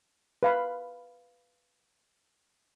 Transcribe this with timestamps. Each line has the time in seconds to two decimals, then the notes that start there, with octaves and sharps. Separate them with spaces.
0.43 B4 F5 B5